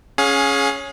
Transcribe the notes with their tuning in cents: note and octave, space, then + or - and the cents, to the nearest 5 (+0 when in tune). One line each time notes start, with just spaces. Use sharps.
C#4 +0 G#4 +10 F5 +40